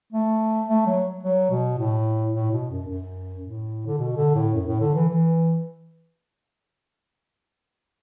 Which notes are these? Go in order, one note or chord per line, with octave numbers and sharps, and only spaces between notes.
A3
A3
F#3
F#3
B2
A2
A2
B2
F#2
F#2
A2
D3
B2
D3
A2
F#2
A2
D3
E3
E3